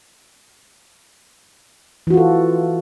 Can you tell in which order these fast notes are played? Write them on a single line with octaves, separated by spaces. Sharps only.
E3 F#4 F4 A4